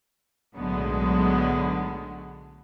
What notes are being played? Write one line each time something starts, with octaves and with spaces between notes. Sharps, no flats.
B1 A2 D3 F#3 G#3 B3